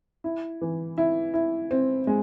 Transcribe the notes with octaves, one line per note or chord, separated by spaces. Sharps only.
E4
E3
E4
E4
C4
G#3